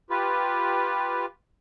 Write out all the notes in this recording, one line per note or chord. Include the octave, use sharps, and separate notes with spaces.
F4 G4 B4